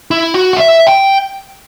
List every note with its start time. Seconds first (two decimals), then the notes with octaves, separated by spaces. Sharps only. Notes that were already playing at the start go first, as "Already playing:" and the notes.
0.11 E4
0.34 F#4
0.53 F#5
0.56 E5
0.87 G5